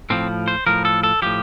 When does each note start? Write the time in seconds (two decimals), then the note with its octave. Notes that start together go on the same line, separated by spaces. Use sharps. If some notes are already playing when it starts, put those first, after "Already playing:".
0.10 A2 F3 C4
0.48 C5
0.67 A2 F3 A#4
0.85 A4
1.03 A4
1.22 A2 F3 G4